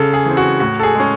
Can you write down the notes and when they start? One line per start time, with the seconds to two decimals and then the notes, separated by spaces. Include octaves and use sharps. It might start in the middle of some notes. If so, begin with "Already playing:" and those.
Already playing: C#3 A4
0.14 G#4
0.25 E3 C4
0.37 F#4
0.60 A2 F#4
0.80 A4
0.83 G#4
0.95 G#3 C#4